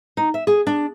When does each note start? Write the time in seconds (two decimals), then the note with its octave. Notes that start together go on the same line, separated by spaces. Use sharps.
0.17 D#4
0.34 E5
0.47 G#4
0.67 D4